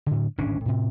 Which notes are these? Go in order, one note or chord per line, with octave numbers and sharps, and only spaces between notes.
A2 D3
D1 G#1 C#4 D4
A2 C3